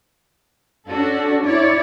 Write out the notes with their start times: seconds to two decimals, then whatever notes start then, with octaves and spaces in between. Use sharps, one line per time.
0.87 C#4 D4 F#4 A4
1.44 E4 C#5 D5